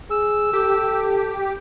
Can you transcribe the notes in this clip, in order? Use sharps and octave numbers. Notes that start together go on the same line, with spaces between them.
G#4 E6
G4 A4